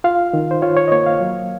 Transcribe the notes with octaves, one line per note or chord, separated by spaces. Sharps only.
F4 F5
D#3
C5
F4 C#5
C#5
D#5
A#3 C#5
F5
F#3